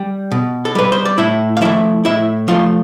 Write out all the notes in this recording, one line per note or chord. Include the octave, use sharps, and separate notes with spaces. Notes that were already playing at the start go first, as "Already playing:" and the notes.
Already playing: G3
B2
A4
G3 B4
C5
D5
A2 E4 E5
F5
F3 A3 E4 E5
A2 E4 E5
F3 A3 F4 F5